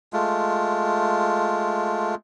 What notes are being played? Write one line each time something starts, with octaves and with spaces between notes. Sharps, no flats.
G#3 A3 F4